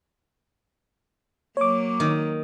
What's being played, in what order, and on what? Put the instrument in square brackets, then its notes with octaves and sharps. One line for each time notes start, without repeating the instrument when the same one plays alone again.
[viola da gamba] F#3 A#3 [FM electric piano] C#5 D6
[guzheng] D#3